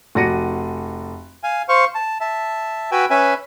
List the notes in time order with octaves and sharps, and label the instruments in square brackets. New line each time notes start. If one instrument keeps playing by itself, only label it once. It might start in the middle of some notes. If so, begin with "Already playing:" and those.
[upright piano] F1 F#4 D5 A#6 C#7 D#7
[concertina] F5 G#5
C5 F5 C#6
A5
E5 A5
F#4 B4 G5 G#5 E6
C#4 B4 E5 G#5